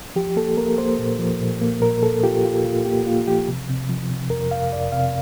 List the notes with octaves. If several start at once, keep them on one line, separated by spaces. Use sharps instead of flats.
F3 G4
A#3 A4
A#3 A#4
A#3 C5
A#2
F3
A#2
A#3
A#2 A#4
A#2 A4
F4 G4
F4 G4
A#2 F4
A#3 G4
A#3 F4
F3 G4
C3
C3
F3
C3
F2 A#4
F2 F5
F2 D5
C3 F5